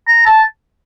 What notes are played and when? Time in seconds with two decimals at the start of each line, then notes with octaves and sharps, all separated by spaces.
0.08 A#5
0.26 A5